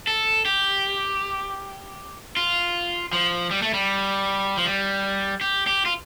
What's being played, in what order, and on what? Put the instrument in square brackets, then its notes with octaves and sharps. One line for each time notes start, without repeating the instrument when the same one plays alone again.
[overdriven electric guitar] A4
G4
F4
F3
G3
A3
G3
F3
G3
G4
G4
F4